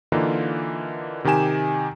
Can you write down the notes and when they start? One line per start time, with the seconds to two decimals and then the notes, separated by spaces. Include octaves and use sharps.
0.12 D3 E3 A#3 D#4 F4
1.24 C3 D#3 D#4 G4 G#5 E7